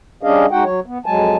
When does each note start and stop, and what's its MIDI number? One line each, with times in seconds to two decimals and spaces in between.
0.23 0.46 55
0.23 0.46 61
0.23 0.46 62
0.23 0.46 68
0.23 0.46 75
0.23 0.46 77
0.51 0.64 56
0.51 0.64 63
0.51 0.64 66
0.51 0.64 78
0.51 0.64 79
0.64 0.80 54
0.64 0.80 73
0.86 0.98 59
1.06 1.37 41
1.06 1.37 54
1.06 1.37 56
1.06 1.37 80
1.06 1.37 81